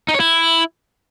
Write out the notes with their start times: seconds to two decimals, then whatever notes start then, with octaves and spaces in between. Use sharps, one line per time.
0.08 D#4
0.14 C#5
0.20 E4